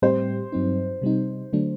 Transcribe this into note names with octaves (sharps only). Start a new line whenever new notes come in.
A2 G3 C4 G4 C5
G2 F#3 C4 D#4
C3 G3 C4 D#4
D3 F#3 A3 D4